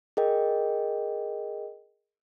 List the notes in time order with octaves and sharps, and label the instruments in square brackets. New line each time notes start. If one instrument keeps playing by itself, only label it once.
[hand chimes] G#4 A#4 D#5 G5